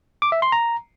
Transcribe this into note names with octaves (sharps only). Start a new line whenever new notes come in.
D6
E5
C6
A#5